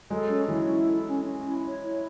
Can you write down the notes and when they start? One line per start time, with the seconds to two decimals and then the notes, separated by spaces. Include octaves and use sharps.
0.10 F#3 G#3 A4
0.29 C#4
0.48 E3 F#3 C#4
0.68 E4
0.86 A4
1.06 C#4
1.25 C#4
1.44 E4
1.63 C#5
1.82 E4